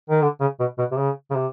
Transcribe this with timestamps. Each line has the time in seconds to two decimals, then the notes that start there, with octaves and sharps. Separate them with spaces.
0.10 D#3
0.22 D3
0.40 C#3
0.60 B2
0.78 B2
0.91 C3
0.98 C#3
1.30 C#3
1.36 C3